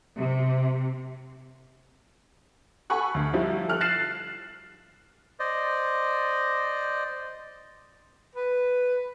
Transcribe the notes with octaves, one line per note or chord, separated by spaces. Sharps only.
C3
A4 F#5 G#5 B5 C#6 F#6
D2
F3 G3 D#4 E4
A4 F6 F#6
F#6 A6 C7 E7
C5 D5 D#5
B4